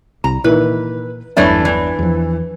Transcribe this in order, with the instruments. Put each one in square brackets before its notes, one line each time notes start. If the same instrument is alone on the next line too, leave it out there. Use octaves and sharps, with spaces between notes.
[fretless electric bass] C2 [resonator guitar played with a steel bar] A#5
[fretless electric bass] A#2 [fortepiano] D#3 E3 [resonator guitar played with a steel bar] B4
[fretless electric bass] G1 E2 F#3 [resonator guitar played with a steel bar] E3 A3 D4 [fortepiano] C#5 E5
[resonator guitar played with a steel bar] E3
[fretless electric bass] E2 F3